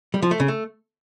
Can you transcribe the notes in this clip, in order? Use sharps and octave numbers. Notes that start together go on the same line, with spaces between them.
G3
F3
A3
C#3
A3